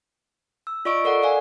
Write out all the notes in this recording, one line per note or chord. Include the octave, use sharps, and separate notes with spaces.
E6
F4 D5 D#5 C#6 E6 D7
A4 A#4 D5 F#5
D5 F5 F#5 G#5